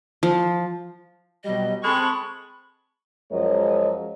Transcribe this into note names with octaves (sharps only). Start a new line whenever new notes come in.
F3
B2 F#3 G3 D#5
G#3 C4 A4 B5 C#6
F#2 F3 G#3 A#4 C#5 D#5